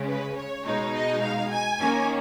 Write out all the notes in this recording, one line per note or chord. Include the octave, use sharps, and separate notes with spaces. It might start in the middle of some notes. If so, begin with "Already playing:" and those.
Already playing: C#3 G#3 C#4
B4
C#5
B2 G#3 D#4
D#5
F5
G#5
D#3 A#3 C#4